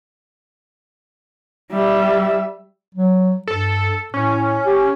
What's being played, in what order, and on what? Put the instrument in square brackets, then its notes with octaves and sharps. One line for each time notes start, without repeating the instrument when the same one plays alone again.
[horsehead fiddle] G3 E5
[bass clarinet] F#3
[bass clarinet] G2 [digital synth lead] A4
[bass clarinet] A2 [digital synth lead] C#4
[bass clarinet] G4